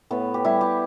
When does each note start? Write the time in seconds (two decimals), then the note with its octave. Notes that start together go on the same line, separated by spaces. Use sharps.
0.11 A2 B3
0.34 G4
0.44 G3 E4
0.61 G4